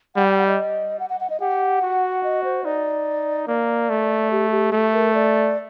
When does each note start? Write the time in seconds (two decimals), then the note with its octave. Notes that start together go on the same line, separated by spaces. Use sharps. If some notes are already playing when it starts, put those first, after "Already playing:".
0.15 G3 F#5
0.27 G5
0.37 F#5
0.47 D#5
1.00 F#5
1.10 F#5
1.20 F#5
1.30 D#5
1.40 G4 F#5
1.82 F#4
2.24 D#5
2.44 C5
2.64 D#4 D5
3.47 A#3 D5
3.90 A3
4.31 G4
4.51 G4
4.72 A3
4.93 A#4
5.14 D5